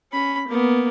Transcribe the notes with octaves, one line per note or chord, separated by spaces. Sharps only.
C#4 B5
A#3 B3